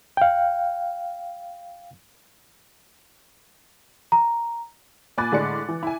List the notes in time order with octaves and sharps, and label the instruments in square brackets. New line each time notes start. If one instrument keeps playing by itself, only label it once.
[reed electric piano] F5 G5
[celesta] A#5
[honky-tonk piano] A#2 G#5 B5 D6 F#6 A6
A2 D3 G#3 D5 C6 C#7
E3
E4 G#5